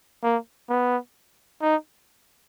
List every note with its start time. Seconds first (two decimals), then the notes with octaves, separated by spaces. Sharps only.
0.23 A#3
0.69 B3
1.62 D#4